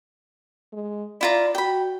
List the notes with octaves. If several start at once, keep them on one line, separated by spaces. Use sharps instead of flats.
G#3
E4 F4 D5 A#5
F#4 G5 B5